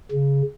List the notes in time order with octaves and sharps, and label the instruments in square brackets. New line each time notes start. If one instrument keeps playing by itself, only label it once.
[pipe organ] C#3